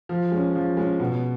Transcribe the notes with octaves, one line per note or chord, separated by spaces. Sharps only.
F3
G#3 C#4
F3
G#3 C#4
B2